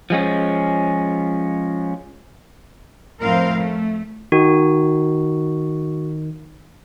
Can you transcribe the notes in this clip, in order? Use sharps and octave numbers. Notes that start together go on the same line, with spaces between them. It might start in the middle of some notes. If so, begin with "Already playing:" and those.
F3 G#3 C#4
F2 A2 C4 A#4 F5
A3
D#3 F#4